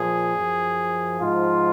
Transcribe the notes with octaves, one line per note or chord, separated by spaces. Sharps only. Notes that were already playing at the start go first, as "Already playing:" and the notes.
Already playing: A#2 F3 G#4
F#2 F3
G#2 F3 F4